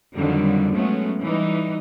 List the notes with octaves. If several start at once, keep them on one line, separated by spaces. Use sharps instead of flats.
F2 D3 D#3 F#3 G3
F#3 G#3 A3 B3 C#4
E3 G3 D#4